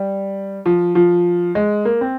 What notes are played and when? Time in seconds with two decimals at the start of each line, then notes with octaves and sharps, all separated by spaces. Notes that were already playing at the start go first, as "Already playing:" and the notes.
Already playing: G3
0.66 F3
0.95 F3
1.55 G#3
1.85 A#3
2.01 C4